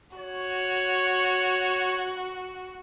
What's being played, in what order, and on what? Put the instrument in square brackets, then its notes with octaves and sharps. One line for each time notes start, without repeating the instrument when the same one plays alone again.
[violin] F#4 [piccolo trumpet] C#5